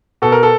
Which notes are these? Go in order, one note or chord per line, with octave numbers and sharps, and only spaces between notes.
B2 A4
A#4
A4